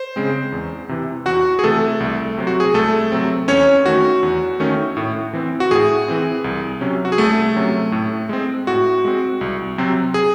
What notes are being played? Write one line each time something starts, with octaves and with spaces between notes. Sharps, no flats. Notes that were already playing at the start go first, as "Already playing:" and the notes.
Already playing: C5
C#3 G#3 C4
E2
C3 E3
E2 F#4 F#5
G#4
C3 E3 A3 A4
C2
C3 F#3 C4
F#4
G#4
C2 A3 A4
C3 F#3 C4
E2 C#4 C#5
D#3 A3 C#4 F#4
E2
D#3 A3 C#4
A2
E3 C4
F#4
A2 G#4
E3 C4
C2
C3 F#3 C#4
F#4
G#4
C2 A3 A4
C3 F#3 C#4
A2
G#3 C4
A2 F#4
G#3 C4
C2
C3 F#3 C4
G#4